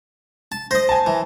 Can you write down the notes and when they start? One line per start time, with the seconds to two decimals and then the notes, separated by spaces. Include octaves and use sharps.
0.52 A5
0.71 C5 D#5 A#6
0.89 G#5 A5
1.07 E3